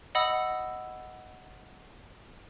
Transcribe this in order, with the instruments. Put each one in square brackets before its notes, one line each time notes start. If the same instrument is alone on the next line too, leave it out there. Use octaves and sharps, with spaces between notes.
[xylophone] D#5 F#5 B5 D#6 E6